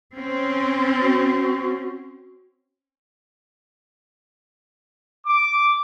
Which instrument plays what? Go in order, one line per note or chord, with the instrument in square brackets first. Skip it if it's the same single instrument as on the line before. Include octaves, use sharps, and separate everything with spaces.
[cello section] C4 C#4
[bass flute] F#4
[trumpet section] D6